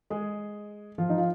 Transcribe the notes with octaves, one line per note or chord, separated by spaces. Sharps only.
G#3 G#4
F3 F4
D#4
F4